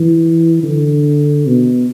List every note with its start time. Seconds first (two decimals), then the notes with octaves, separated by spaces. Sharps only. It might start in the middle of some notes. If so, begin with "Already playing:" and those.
Already playing: E3
0.63 D3
1.46 B2